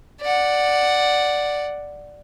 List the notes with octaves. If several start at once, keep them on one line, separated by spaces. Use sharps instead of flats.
D5 F#5